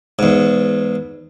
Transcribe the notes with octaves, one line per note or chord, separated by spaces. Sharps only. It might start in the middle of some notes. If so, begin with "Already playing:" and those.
E2 G#2